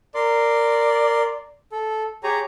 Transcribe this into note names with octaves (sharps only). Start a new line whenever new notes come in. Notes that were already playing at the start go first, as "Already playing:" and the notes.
A#4 D5 C6
A4
G4 G#4 C#5 A#5